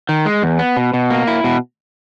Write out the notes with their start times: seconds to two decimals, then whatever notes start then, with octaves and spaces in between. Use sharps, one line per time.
0.09 D#3
0.26 G#3
0.43 E2
0.59 B3
0.77 B2
0.94 B2
1.10 A#3
1.27 E4
1.44 B2